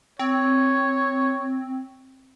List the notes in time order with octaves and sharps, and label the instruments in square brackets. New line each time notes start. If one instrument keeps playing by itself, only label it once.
[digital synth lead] C4 [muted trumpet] C#5